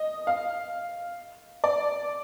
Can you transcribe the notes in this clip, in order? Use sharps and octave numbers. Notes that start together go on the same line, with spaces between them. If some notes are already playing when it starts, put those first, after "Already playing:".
Already playing: D#5
F5
D5